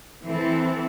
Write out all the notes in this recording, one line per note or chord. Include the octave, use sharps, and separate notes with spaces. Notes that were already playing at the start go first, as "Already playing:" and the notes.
E3 C4 A4